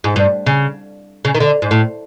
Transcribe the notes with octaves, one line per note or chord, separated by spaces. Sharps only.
G#2
G2
C#3
C#3
D#3
D3
G#2
A2